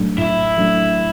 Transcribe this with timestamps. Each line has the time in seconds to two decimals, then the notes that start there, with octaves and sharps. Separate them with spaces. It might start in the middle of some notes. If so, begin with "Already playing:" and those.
Already playing: A2 F#3 A3 D4
0.18 A2 E4
0.58 F#3 A3 D4